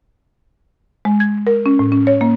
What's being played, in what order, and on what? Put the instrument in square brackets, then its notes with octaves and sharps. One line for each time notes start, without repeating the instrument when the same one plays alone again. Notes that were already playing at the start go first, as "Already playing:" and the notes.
[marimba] G#3
G#6
A#4
C#4
A2
C#4
C#5
A#3